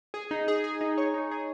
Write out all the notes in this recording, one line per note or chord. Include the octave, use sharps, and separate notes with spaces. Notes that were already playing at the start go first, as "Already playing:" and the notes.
G#4
D#4
G#4
G#4
D#4
C#5
D#4
G#4